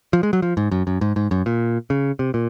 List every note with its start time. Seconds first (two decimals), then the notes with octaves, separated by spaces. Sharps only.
0.13 F3
0.23 G#3
0.33 F#3
0.42 F3
0.57 G#2
0.72 F#2
0.87 F#2
1.01 G#2
1.16 G#2
1.31 F#2
1.46 A#2
1.90 C#3
2.19 C3
2.34 A#2